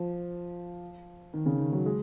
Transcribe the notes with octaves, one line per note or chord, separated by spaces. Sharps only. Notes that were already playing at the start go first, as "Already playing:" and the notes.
Already playing: F3
D#3
C#3
D#3
F#3
G#3